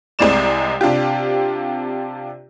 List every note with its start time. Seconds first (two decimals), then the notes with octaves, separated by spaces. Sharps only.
0.19 C2 C3 G#3 D5 E7
0.81 C3 D4 F4 G4